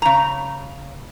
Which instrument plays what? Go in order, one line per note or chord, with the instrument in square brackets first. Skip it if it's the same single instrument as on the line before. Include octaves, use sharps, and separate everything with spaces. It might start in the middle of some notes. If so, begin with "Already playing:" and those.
[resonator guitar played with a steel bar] C#3 A#5